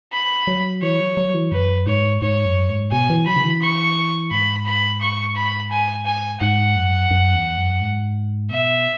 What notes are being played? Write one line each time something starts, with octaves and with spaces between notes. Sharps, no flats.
B5
F#3
E3 C#5
F#3
F#3
E3
F#2 B4
G#2 C#5
G#2 C#5
F#2
G#2
B2 G#5
E3
F#3 B5
C#3
E3
C#6
G#2 B5
B5
C#6
B5
G#5
G#5
G#2 F#5
F#2
F#2
E2
F#2
G#2
B2 E5